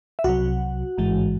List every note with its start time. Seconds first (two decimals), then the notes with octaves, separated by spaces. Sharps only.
0.19 E5
0.24 C2 C3 F#3 F#4 F#5
0.98 A1 G#2 E3 G#3